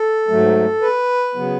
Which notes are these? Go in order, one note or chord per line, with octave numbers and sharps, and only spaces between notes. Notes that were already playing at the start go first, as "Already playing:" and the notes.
Already playing: A4
G#2 F#3 A3
B4
C#3 F#3 B3